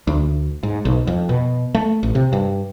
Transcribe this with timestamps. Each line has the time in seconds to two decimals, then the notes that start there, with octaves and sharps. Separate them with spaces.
0.07 D2
0.63 G#2
0.85 B1
1.07 F2
1.29 B2
1.75 A3
2.03 A1
2.15 C3
2.33 G2